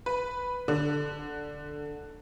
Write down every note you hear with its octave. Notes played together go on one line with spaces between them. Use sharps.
B4
D3